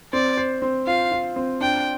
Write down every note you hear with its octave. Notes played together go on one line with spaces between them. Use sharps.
C4 D5
C5
C4
F4 F5
F4
C4
D4 G5